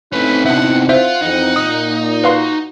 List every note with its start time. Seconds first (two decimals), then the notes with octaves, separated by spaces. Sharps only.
0.12 A3 C4 C#4 D#4 E4 B4
0.46 C3 B3 D4 E5 F#5
0.89 F4 C5 E5 F#5
1.22 F2 E3 C4 D#4
1.56 A#2 D#6
2.24 F#4 B4 F5 C6